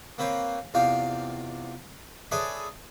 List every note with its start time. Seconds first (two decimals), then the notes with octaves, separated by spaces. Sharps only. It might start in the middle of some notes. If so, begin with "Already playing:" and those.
0.18 A#3 C4 B4 C#5 G5
0.74 E2 C3 F4 D5 F5 G5
2.31 G#4 A4 B4 C#5 D5 E5